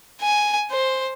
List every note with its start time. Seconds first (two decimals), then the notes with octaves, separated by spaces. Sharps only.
0.21 G#5
0.71 C5